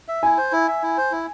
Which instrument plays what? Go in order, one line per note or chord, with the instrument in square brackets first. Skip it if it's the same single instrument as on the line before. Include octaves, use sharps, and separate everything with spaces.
[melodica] E5
[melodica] E4 [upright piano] G#5
[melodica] C5
E4
E5
E4
C5
E4